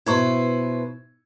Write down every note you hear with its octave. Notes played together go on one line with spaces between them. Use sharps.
B2 E4 B4 C5 C#6 G#6